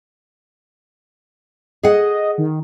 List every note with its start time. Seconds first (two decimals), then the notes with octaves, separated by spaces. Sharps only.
1.83 G#4 D#5 F#5
2.38 D#3